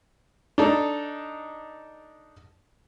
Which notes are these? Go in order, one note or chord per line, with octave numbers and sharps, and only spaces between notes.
D4 D#4 A4